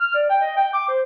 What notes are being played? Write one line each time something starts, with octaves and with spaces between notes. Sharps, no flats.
F6
D5
G5
D#5
G5
D6
C5